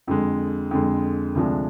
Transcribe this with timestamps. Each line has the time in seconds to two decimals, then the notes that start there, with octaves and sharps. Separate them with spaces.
0.07 F2 D3 G#3
0.71 F2 D3 G#3
1.35 D2 C3 F3 G#3 D4